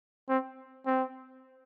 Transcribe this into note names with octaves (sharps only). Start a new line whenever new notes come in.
C4
C4